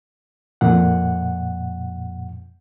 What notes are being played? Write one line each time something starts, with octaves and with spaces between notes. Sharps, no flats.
F2 A#2 F#5